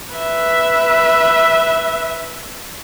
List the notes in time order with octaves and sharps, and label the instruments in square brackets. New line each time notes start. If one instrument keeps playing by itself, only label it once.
[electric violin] B4 E5